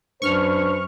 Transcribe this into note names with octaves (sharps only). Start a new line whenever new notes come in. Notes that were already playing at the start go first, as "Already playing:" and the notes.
F#2 D4 B4 C5 C#6 F6